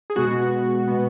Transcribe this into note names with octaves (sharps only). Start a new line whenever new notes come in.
G#4
B2 G#3 B3 F#4
B2 G#3 B3